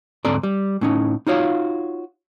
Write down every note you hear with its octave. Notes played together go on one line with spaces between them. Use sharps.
D2 G#2 C4 A4 D5 A#5
G3
A2 C#4 D#4
D#4 F4 F#4 C#5 F5